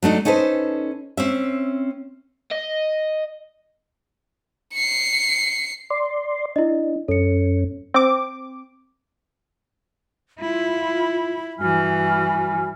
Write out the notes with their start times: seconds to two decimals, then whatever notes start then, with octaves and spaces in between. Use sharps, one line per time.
0.03 F#3 A3 D4 D#4
0.25 C#4 D#4 A4 B4 C5
1.17 C4 C#4 E5
2.51 D#5
4.73 C7 C#7
5.90 D5 C6
6.56 D4 E4 D#5
7.08 F#2 C#4 A4 C#7
7.94 C4 D6
10.40 E4 F4
11.59 G2 E3 F#4 G#5 F6